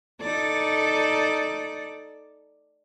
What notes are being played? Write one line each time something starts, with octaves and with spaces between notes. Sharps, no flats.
D#4 A4 D5